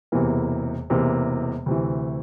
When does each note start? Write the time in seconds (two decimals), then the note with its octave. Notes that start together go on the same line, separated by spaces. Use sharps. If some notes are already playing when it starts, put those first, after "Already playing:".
0.12 E1 E2 C3 E3 A#3
0.90 E1 E2 C3 E3 A#3
1.66 D2 C3 E3